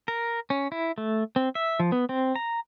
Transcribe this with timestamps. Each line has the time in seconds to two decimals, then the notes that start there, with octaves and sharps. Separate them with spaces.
0.08 A#4
0.50 C#4
0.72 E4
0.98 A3
1.36 C4
1.55 E5
1.80 F3
1.92 B3
2.09 C4
2.36 A#5